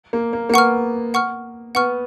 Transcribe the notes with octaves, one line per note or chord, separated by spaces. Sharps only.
A#3
A#3
A#3
B3 F#5 C#6 F6
F#5 C#6 F6
B3 F#5 C#6 F6